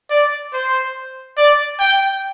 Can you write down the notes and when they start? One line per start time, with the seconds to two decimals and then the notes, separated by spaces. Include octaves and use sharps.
0.10 D5
0.53 C5
1.38 D5
1.79 G5